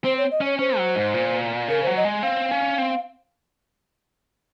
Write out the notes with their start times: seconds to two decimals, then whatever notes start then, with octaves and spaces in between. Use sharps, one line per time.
0.04 C4 C5
0.18 C#5
0.31 D#5
0.41 C#4 C#5
0.59 C#4 C5
0.78 F#3
0.95 G#2
1.14 A#2
1.68 C#3 A#4
1.83 F#3 C5
1.97 D#5
2.05 G#3
2.23 C4 F5
2.51 C#4
2.78 C4